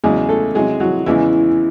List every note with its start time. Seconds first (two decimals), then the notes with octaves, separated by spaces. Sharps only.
0.04 E2 C#3 F#3 G#3 G#4
0.29 A3 A4
0.55 C3 F#3 G#3 G#4
0.80 F#3 F#4
1.06 E2 C#3 E3 G#3 E4